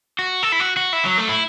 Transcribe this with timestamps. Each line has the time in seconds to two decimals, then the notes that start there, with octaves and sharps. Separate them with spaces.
0.19 F#4
0.43 A4
0.52 E4
0.60 F#4
0.77 F#4
0.93 E4
1.05 F#3
1.18 A3
1.29 E4